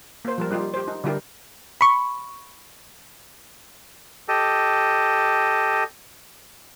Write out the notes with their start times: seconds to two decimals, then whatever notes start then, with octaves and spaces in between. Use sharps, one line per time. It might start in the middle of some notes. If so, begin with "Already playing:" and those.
0.25 A#3 C5
0.38 F3 G3 A#4
0.51 G3 D#4 F4 G4
0.74 G4 C5
0.88 D#4
1.04 D3 G3 E4 G4 A#4
1.81 B5 C#6
4.28 G4 A4 D#5